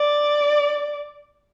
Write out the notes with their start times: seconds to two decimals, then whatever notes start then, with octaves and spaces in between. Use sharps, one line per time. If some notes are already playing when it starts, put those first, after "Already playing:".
Already playing: D5